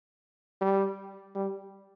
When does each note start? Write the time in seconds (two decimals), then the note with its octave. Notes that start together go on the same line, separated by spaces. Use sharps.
0.61 G3
1.35 G3